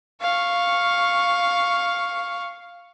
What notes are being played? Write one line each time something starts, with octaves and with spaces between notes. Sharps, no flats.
F5 C#6